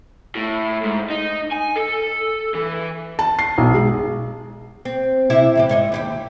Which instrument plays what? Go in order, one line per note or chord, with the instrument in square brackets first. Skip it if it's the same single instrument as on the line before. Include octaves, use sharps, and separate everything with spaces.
[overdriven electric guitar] A2
G#2
D#4
G#5
A4
E3
[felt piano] A5
C7
B1
G#3
[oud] C4
C3 E4 G4
E2 A2 G4
G#2 C#5 D#5
D#2 E4 G4